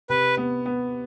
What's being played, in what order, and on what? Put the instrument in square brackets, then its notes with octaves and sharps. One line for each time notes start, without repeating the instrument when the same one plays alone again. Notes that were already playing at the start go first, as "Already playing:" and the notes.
[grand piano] C3 [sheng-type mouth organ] B4
[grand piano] B3
B3